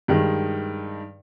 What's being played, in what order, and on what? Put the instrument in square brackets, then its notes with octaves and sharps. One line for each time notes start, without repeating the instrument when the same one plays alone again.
[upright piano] G2 D#3 G#3